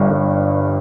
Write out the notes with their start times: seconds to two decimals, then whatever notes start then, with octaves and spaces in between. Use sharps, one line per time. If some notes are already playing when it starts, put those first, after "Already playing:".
Already playing: G1 G2
0.10 G1